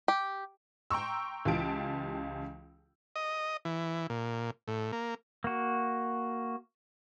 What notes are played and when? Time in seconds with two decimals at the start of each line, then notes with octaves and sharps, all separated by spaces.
0.08 G4
0.90 G5 A#5 C6 C#6 E6
1.45 C#2 E3 F4 G4 A5 D7
3.16 D#5
3.65 E3
4.10 A#2
4.68 A2
4.92 A#3
5.44 A#3 F#4